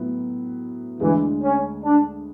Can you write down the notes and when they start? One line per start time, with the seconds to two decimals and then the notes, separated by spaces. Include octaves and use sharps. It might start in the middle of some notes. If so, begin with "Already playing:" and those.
Already playing: A2 F#3 B3 E4
1.00 D2 D3 E3 G#3
1.42 C#4
1.84 D4